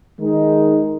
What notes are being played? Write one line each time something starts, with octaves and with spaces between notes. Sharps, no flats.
D#3 G#3 D#4